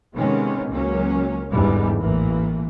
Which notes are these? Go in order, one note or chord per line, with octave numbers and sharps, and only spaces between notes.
C3 D#3 G#3 B3 C#4
C#2 F#3 A#3 C#4
G1 E2 G#2 D3 E3 G3
A1 E3 A#3